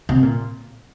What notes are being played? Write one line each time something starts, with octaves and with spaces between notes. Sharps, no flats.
C3
A#2